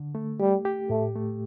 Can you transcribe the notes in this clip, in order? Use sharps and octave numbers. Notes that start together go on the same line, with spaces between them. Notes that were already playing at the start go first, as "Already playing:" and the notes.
Already playing: D3
A3
G3 G4
G4
A2 A3
A3